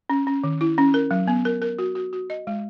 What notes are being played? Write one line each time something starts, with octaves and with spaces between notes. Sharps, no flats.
C#4
C#4
D#3
E4
C#4
A#4
F#3
B3
A#4
A#4
F#4
F#4
F#4
D#5
G#3